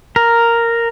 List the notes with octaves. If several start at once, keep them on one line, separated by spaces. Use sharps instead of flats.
A#4